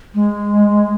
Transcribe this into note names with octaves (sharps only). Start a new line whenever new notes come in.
G#3